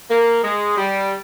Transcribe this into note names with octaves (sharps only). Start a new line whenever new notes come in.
A#3
G#3
G3